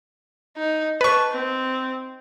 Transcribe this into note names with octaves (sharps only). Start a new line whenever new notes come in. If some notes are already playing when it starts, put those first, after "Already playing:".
D#4
B4 A5 C#6
C4